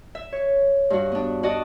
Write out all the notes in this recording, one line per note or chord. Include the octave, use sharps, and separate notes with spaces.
E5
C#5
G2 F#4
B3 D4
D4 F#4 D5 D#5 A5